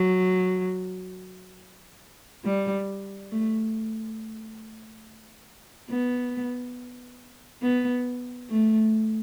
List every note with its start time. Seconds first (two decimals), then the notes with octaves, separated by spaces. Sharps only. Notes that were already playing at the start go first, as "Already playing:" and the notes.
Already playing: F#3
2.44 G3
3.31 A3
5.89 B3
7.62 B3
8.50 A3